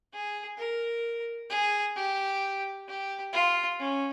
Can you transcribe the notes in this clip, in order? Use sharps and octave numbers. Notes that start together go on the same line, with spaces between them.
G#4
A#4
G#4
G4
G4
F4
C#4